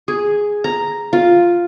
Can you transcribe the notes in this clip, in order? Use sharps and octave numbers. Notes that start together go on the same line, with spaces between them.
G#4
A#5
F4